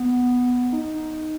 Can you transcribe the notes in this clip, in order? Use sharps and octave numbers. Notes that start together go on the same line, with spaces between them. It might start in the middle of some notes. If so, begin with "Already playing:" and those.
Already playing: B3
D#4